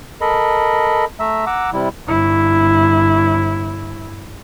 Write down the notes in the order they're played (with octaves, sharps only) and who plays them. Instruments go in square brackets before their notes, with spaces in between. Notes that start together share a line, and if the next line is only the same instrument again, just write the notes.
[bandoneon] A4 A#4 D#5 B5
A3 E5 A#5 E6
F#5 A#5 D6 E6
C3 G3 E4
[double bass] G1 E4